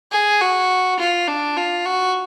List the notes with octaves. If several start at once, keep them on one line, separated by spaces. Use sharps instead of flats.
G#4
F#4
F4
D4
F4
F#4